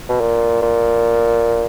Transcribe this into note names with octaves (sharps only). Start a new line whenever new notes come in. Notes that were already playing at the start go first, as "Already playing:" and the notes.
B2
A#2
A#2